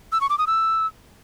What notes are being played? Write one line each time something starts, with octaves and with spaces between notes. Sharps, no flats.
E6
C#6
D6
D#6
E6